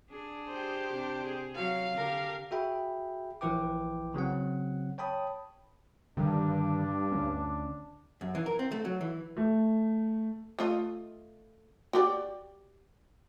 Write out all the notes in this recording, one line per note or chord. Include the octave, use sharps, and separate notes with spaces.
D4 G#4
G4 C5
C3 D4
G#4
F#3 F5
D3 G4 A#4
F#4 G#4 E5 G5 B5
A#1 E3 E4 B4 G5 D6
C#3 F#3 C4 F#5
C#5 G5 A5 B5 D#6
G2 D3 D#3 G3 D4
D2 B3 C#4
F#2
E3
A#4
C4
A3
F#3
E3
A3
A3 F4 D#5
F#4 G4 D5